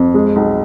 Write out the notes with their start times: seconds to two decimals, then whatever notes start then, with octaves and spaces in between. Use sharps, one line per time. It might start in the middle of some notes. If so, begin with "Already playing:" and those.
Already playing: F2
0.14 G#3
0.36 B1